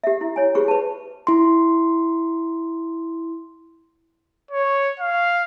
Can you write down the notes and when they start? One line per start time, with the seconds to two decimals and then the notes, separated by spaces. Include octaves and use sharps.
0.04 G4 E5
0.21 E4
0.36 E4 C#5 G#5
0.55 F4 G4 G#4 B4 C5 C#6
0.68 B4 A5
1.27 E4 C6
4.51 C#5
5.00 F5